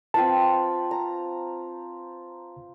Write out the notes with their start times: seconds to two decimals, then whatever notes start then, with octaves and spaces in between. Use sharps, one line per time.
0.14 C4 F4 B4 A5
0.91 A#5